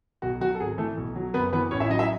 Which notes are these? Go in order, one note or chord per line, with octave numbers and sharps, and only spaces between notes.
B1 F#4
F#3 F#4
A4
G#1 G#4
E3 A3 A4
B1
F#3
F#1 B3 B4
E3 B3 B4
A1 C#4 C#5
E4 E5
F#3 D#4 D#5
E4 E5